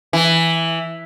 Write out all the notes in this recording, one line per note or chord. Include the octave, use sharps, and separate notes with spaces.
E3